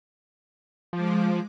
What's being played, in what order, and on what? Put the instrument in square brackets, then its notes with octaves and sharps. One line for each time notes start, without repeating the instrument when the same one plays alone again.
[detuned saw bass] F3 [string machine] G#3 D6